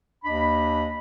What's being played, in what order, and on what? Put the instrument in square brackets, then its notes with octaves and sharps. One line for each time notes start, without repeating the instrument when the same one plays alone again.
[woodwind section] D#2 D4 D#5 B5